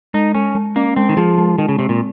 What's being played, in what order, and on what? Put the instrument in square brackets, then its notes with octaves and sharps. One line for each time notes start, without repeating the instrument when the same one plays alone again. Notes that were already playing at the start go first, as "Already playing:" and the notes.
[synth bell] G#3 [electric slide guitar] D#4
[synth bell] G#3 [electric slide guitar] C#4
[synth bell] G#3
[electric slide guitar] A#3 [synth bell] C#4
[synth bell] G#3 [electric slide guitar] C4
[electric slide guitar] D#3
[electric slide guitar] F3 [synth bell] G#4
[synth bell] G#3
[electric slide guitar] D#3 [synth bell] G#3
[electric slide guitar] C#3
[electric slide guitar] C3 [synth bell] C4
[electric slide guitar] A#2